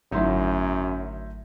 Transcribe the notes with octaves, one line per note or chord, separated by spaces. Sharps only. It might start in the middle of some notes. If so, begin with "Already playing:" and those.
G#1 F#2 D3 F#3 A3 D#4 E4 C6